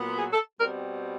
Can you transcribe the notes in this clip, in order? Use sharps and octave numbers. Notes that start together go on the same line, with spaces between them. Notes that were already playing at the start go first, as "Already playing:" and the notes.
Already playing: A#2 F#3 B3
G#4
A4
B2 G3 C4 A#4